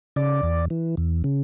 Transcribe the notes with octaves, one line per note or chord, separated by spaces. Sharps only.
C#3 D5
E2
E3
E2
C#3